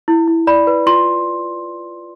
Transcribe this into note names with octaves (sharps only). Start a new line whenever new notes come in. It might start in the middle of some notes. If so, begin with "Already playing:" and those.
E4
E4
D5 B5
B4
F4 C6